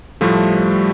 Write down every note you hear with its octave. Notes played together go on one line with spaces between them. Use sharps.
A2 F3 G3 A3